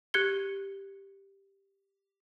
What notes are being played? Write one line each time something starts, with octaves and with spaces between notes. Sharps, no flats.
G4 F#6 G#6 C#7 G7